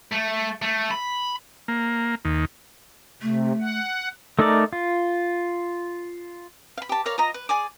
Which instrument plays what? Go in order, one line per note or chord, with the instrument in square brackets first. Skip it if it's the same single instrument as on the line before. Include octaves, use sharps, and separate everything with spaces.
[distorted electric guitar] A3
A3
B5
[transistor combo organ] A#3
D#2
[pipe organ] C3 [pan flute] A3
[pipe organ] F#5
[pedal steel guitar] A3 D#4 A4 A#4 D5
F4
[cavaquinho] F5 B5
G4 A5
A#4 C#5 D5 F5
F4 D#5 A#5
B4
G#4 D5 G#5 D6